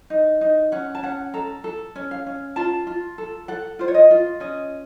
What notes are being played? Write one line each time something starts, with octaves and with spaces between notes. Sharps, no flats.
D#4
D#4
C#4 F#5
A5
C#4 F#5
A4 A#5
A4
C#4
F5
C#4
F4 A5
F4
A4
A4 F#5
F4 C5
C#5
D#5
F4
C#4 D#5